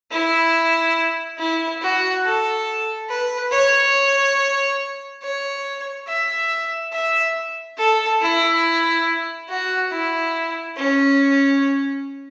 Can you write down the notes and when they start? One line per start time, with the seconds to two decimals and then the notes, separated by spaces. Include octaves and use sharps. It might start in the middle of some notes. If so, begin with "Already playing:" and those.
0.12 E4
1.39 E4
1.82 F#4
2.25 A4
3.09 B4
3.52 C#5
5.23 C#5
6.08 E5
6.93 E5
7.78 A4
8.21 E4
9.49 F#4
9.91 E4
10.77 C#4